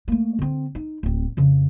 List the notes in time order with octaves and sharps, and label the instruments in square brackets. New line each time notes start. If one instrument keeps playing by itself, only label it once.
[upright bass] A3 A#3
D3 C4
D#4
D1 C4
F2 C#3